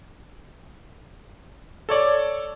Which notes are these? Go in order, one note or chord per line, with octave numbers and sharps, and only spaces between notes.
A4 C#5 D5